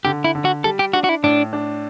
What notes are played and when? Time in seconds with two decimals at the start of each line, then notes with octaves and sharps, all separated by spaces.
0.05 D3 G4
0.24 E4
0.35 D3
0.45 F#4
0.64 G3 A4
0.79 G4
0.93 D4 F#4
1.04 F#4
1.09 E4
1.23 A2 D4
1.53 D4